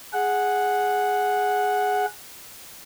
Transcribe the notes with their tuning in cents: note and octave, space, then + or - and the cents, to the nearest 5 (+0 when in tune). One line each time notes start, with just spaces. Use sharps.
G#4 +0 F#5 -5